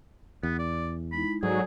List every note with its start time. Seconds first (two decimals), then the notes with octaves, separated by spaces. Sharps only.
0.43 E2 B3
0.59 D5
1.12 G#3 D#4 E4 B5
1.43 G#2 F#3 G#4 A4 D5 G#5